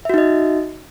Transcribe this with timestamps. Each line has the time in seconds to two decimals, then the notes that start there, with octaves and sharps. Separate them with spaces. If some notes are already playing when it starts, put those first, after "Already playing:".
0.05 E5
0.10 F#4
0.14 D#4
0.18 D#5